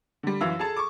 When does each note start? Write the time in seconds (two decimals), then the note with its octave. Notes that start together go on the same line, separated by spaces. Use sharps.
0.23 D3 G3
0.41 F#2 E3 E5 F5 E6
0.59 G#4 A4 A5
0.76 C#6 D6